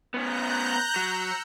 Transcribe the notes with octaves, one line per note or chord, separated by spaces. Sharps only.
B3 C#4 A#5 F#6 G6
F#3 E6 C#7